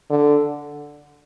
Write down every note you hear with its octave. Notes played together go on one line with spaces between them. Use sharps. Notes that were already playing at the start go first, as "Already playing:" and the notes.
D3